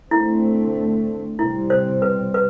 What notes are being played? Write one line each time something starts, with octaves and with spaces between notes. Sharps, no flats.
D3 A3 C4 E4
C3 G3 C4 E4
C5
B4
B4